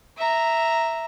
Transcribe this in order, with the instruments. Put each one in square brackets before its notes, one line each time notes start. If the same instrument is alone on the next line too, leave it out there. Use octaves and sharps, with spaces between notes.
[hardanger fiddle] E5 A#5